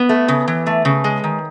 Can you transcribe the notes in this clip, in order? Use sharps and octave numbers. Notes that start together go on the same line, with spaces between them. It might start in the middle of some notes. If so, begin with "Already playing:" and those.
Already playing: B3
A3
C#3
E3
A3
C#3
G#3
D#3